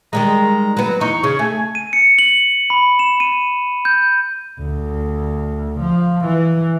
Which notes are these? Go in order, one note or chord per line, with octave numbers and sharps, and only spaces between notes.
D#3 G3 G#3 A#5
F#3 B3
E2 D#4 C#6
C#3 C#5
A3 G#5
D#7
C#7
F#7
B5
E7
D#7
G6
D2
F3
E3